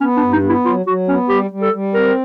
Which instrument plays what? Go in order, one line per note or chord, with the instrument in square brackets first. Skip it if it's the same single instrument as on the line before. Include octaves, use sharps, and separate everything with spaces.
[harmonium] B3 [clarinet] C#4
[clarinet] D4
[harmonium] G2
[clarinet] D#4
[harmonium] B3
[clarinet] E4
[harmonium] F#3 [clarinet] F4
[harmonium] F#3 [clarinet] F#4
[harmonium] B3 [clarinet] C#4
[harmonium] G3 [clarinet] G4
[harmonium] G3
[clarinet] A4
[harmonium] G3
[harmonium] C4 [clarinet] A#4